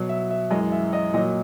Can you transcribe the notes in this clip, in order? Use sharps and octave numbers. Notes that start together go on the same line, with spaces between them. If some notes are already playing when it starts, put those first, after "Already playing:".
Already playing: B2 F#3
E5
E5
F#2 E3 G#3 D#5
E5
D#5
A#2 F#3 D#5